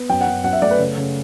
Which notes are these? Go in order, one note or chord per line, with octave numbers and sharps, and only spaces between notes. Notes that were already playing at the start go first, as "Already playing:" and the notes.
Already playing: B3
F#2 G5
F#5
F#2
F#2 F#5
E5
A3 D5
B4
C#3
C#3